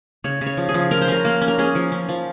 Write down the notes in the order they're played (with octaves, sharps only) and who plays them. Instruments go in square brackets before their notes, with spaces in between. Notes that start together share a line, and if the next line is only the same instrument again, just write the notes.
[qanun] C#3 C#5
C#3
C#5
F3
G#4
F3
C#4 A#4
C5
C#4 A#4
A#3
C#4
A#4
C#4 G#4
F3
C#4
F3